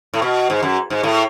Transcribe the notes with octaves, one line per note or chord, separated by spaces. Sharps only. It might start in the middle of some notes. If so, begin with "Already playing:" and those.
A2
B2
G#2
F#2
G#2
A2